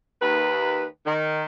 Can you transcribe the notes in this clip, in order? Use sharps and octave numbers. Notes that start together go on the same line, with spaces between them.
D#2 B4
D#3